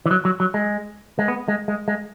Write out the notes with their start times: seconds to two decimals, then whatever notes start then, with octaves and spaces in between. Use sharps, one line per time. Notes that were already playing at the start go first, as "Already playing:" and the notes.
0.06 E3
0.11 F#3
0.25 F#3
0.40 F#3
0.54 G#3
1.19 G#3
1.28 B3
1.48 G#3
1.68 G#3
1.88 G#3